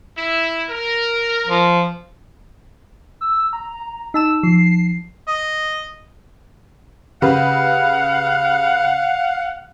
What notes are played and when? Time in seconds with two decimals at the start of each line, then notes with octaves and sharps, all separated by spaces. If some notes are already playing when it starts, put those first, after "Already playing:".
0.17 E4
0.69 A#4
1.47 F3
3.21 E6
3.53 A#5
4.14 D#4 A5 E6 E7
4.43 F3 C7
5.28 D#5
7.22 C#3 G4 B4 F5 F#5